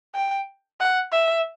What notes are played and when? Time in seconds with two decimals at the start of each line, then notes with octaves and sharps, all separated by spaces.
0.15 G5
0.80 F#5
1.12 E5